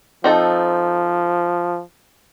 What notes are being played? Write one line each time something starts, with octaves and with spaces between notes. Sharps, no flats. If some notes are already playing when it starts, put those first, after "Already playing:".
F3 C4 D#4 A4